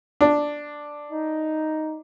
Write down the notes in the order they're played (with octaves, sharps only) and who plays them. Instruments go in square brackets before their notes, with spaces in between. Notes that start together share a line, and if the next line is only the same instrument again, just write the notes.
[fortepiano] D4
[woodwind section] D#4